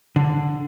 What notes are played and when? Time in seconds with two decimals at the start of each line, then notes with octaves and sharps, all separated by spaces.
0.16 D3